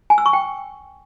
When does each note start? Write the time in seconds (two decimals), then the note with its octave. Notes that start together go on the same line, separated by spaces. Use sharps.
0.10 G#5
0.18 E6
0.26 C#6
0.33 G5